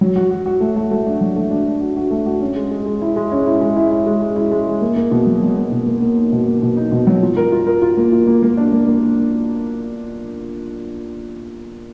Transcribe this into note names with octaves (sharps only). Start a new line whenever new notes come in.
F#3
F#4
F#4
F#4
A3
A3
A3
D4
F#3
A3
D4
D4
F#4
F#4
A3
F#4
C#4
G#3
G#3
G#3
E4
G#3
C#4
E4
G#3
E4
E4
G#3
G#3
E4
G#3
G#3
A#3
A#3
B2
F#3
F#3
A#3
B2
A#3
A#3
D#4
B2
A#3
B2
D#4
B2
F#3
F4
A#4
F4
A#4
F4
A#3
F4
A#3
A#3
D4
A#3
A#3